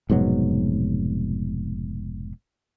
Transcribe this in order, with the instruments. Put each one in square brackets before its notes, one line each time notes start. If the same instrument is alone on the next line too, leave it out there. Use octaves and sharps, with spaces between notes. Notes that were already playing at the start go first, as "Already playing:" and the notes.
[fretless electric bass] F1 G#2 B2 F#3